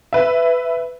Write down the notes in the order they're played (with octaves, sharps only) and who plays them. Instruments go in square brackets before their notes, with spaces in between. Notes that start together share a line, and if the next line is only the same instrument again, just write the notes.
[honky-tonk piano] B4 E5